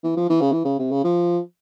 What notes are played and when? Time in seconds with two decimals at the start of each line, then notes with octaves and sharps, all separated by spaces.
0.04 E3
0.17 F3
0.29 E3
0.41 C#3
0.53 E3
0.65 C#3
0.79 C3
0.91 C#3
1.04 F3